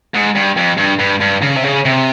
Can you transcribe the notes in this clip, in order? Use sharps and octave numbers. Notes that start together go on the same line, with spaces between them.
G#2
G2
F2
G2
G2
G2
C#3
C3
C#3
C3